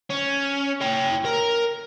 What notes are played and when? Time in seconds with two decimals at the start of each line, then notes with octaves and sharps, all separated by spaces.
0.10 C#4
0.81 C#5 G5
1.25 A#4